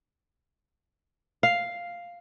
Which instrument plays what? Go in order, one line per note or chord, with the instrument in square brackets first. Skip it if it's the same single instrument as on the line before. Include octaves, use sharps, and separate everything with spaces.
[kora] F5